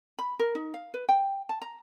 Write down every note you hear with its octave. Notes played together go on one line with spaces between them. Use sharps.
B5
A#4
D#4
F5
B4
G5
A5
A#5